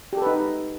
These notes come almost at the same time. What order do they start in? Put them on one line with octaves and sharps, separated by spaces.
G4 A4 B4 D#4